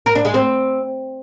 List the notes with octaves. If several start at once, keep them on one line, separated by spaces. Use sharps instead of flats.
A#4
D4
G#3
C4